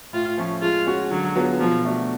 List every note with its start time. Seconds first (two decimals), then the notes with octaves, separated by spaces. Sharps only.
0.13 A2 F4
0.38 F3 A3 C#4
0.61 G#3 F4
0.87 C#4 F#4
1.11 D3 F#3
1.36 F#3 B3 F4 G#4
1.60 B2 F3
1.85 A3 D4 F#4